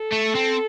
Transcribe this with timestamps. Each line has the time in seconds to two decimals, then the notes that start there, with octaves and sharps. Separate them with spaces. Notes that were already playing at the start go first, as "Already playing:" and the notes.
Already playing: A4
0.12 A3
0.35 C4